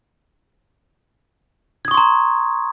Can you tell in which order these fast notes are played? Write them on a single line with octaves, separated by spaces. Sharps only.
G#6 D#6 C#6 C6 A#5